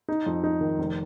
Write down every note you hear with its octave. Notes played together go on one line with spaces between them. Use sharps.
D#4
F2
D#4
D#3
F1